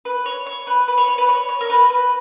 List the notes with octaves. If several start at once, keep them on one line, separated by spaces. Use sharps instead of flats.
B4
C#5
C#5
B4
B4
C#5
C#5
B4
C#5
C#5
A#4
B4
B4